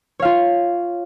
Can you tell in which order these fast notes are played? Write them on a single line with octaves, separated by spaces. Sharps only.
C#5 F5 F4